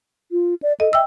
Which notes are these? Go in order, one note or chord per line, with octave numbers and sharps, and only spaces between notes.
F4
D5
A4 D#5
E5 G5 E6